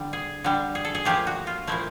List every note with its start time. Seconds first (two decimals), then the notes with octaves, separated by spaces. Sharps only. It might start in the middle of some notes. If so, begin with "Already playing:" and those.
Already playing: D3 G3
0.13 G#4
0.44 D3 G3
0.75 G#4
0.85 A4
0.95 G#4
1.05 A#2 F3 A3 G4
1.27 F#4
1.47 F4
1.67 A#2 F3 A3 E4